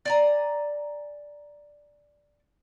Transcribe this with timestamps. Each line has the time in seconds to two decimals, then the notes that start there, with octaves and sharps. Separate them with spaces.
0.05 D5 G#5 A#5